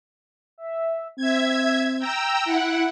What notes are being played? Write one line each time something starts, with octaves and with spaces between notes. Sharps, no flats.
E5
C4 E5 G#6
G5 A#5 E6
E4 F#5 D7